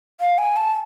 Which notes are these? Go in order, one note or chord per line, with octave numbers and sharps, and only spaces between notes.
F5
G#5
A5